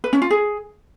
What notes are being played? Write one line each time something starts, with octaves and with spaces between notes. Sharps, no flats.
B4
C#4
F4
G#4